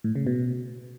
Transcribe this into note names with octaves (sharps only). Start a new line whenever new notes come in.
A2
C#3
B2